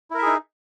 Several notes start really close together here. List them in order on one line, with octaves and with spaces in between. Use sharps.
E4 A#4 E5 G#4 D#4